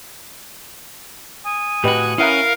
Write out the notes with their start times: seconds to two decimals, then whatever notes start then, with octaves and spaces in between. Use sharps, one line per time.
1.44 G#5 D#6
1.84 A2 F#4 G4 B4 D#5
2.18 C#4 E4 A#4 F5 F#5 A#5